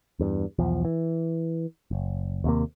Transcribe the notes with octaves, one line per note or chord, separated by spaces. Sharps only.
E2 G2
B1 E2 F3
E3
F#1
D#2 C3 A#3